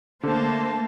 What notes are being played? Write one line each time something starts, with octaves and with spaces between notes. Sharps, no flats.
D3 A3 A#3 C5 A5